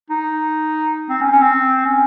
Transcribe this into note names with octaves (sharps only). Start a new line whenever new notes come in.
D#4
C4
C#4
C#4
C4
C#4